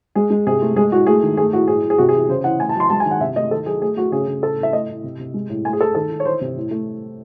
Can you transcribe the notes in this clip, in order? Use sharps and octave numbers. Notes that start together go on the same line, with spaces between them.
G#3 G#4
G#3
C3 G#4
A3
G#3 G#4
A2 F#4
A3 G#4
D#3
A3 G#4
A2 F#4
A2 G#4
A2
G#4
C3 F#4
G#4
E3
C#3 C5
E3 F#5
A3 G#5
A5
F#3 C6
G#3 A5
G#5
D#3
F#5
C3 E5
A3 D#5
D#3 A4
F#3 G#4
A3 G#4
A3 F#4
C#3 G#4
C#3
A2 A4
A2
E5
A3 D#5
A2
C3
C3
G#3
A2
A3 G#5
G#4
A3 A4
D#3 A4
D#3
C#5
E3 C5
C3
A2
A3